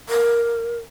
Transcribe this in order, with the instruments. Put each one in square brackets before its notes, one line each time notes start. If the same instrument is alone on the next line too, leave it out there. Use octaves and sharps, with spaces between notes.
[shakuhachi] A#4